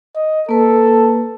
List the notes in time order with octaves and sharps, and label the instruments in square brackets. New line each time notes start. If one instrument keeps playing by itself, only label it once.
[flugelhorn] D#5
[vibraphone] A#3 B4 [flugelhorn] A4